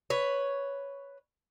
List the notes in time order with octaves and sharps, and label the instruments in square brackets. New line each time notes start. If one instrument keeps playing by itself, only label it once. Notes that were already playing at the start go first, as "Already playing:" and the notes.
[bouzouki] B4 C#5